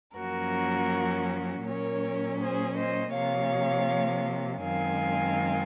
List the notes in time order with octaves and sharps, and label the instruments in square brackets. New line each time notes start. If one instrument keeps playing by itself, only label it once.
[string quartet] F#2 F3 A#3 C#4 F#4 A#4
A#2 F#3 C#4 A#4 C#5
G#4 C5
C5 D#5
C3 F3 A#3 C#5 F5
F#2 D#3 G#3 C4 F5 G#5